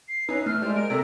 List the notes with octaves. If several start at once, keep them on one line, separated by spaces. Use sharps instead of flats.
C7
C#4 D#4 E4 B4
E3 A3 E4 F6
G3 G#3 E4 C5
F4 A#4 D7
C3 A3 A4 A#4 A#6